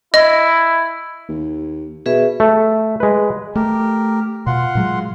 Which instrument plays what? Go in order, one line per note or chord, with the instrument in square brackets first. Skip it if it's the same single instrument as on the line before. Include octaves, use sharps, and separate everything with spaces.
[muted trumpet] E4 [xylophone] D#5
[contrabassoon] D#2
[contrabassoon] B2 [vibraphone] G#4 B4 E5
[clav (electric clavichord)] A3
G#3 B4
[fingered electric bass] A3 [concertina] G4 A#4
[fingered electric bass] B2 [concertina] F4 F#5 C6
[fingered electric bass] A#2 F#3 G#3